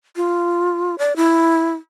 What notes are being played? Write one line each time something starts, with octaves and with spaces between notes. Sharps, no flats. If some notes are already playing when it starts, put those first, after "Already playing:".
F4
D5
E4